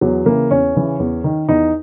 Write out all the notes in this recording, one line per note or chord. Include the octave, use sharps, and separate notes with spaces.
E2 F#3
C#3 E3 A#3
E2 C#4
C#3 E3
E2
D#3
E2 D#4